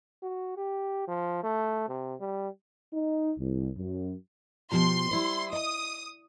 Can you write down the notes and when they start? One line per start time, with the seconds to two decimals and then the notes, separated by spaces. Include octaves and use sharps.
0.22 F#4
0.57 G4
1.08 F3
1.43 A3
1.88 C3
2.20 G3
2.93 D#4
3.37 C2
3.77 F#2
4.72 B2 F3 G4 C6
5.11 G3 E4 C5
5.53 D#5 D#6